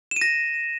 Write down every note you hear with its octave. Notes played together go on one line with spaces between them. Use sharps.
E7
D#7
A#6